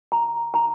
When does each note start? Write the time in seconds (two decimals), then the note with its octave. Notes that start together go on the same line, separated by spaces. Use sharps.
0.12 A#5
0.54 A#5